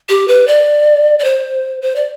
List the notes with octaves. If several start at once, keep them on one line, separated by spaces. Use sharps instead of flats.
G4
B4
D5
D5
C5
C5
D5